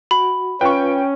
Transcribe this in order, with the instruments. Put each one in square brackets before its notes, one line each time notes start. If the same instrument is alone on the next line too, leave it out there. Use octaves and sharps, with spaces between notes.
[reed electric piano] F#4 [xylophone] B5
[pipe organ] C#4 [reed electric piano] F4 B4 [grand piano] G5 C#6